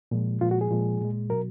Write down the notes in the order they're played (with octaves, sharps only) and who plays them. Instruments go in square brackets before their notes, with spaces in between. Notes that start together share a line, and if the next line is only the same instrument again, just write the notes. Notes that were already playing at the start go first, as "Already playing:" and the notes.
[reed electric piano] A#2 F3 G#3
A#2 F3 G#3 F4
F#4
G#4
A#2 F3 G#3
A#2 G#3
B2 F#3 A#4